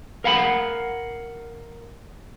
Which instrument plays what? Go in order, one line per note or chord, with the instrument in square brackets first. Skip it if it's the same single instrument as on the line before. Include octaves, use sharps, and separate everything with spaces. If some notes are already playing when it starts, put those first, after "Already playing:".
[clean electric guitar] A#4 F5 F#5 B5